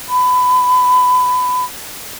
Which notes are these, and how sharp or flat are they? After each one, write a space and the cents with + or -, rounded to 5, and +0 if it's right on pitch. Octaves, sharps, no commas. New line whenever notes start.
B5 +20